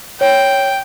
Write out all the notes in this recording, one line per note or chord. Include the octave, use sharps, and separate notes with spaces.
C#5 G5